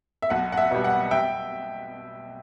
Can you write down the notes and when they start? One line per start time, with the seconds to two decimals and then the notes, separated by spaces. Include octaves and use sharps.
0.22 E5
0.30 B1 F#5
0.52 F#5
0.58 E5
0.71 B2 G3
0.84 F#5
1.11 E5 G5